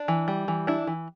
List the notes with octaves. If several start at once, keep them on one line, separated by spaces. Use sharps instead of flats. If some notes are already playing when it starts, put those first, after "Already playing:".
Already playing: D4
E3
G3
E3
D4 E4
E3